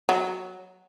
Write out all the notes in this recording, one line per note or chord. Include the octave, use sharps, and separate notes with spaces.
F#3